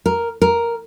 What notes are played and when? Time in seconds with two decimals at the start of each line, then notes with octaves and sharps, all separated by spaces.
0.06 A#4
0.42 A#4